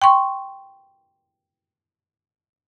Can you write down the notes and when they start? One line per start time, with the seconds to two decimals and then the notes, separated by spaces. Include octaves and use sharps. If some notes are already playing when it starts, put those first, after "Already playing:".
0.02 G5 C6 C#6